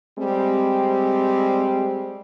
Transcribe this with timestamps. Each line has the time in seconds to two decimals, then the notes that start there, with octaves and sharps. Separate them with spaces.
0.17 G3 G#3 C4